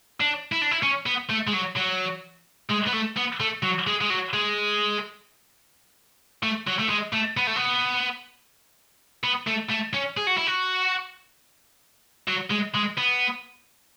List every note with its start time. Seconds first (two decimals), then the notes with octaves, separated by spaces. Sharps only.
0.21 D4
0.52 E4
0.61 D4
0.71 E4
0.83 C#4
1.06 B3
1.29 A3
1.47 G#3
1.53 F#3
1.76 F#3
2.70 G#3
2.88 B3
2.94 A3
3.17 B3
3.40 A3
3.63 F#3
3.87 G#3
4.01 G#3
4.10 F#3
4.33 G#3
6.43 A3
6.67 F#3
6.79 A3
6.90 G#3
7.13 A3
7.37 B3
7.47 A3
7.56 B3
9.24 B3
9.47 A3
9.70 A3
9.94 C#4
10.17 G#4
10.27 F#4
10.37 E4
10.47 F#4
12.28 F#3
12.50 G#3
12.74 G#3
12.97 B3